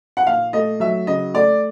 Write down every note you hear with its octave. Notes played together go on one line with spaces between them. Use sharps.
F#5
A#2 F5
A3 D#5
F#3 E5
C#3 D#5
A3 D5